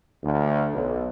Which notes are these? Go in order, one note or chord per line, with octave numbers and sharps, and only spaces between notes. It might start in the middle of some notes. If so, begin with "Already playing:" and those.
D2
B1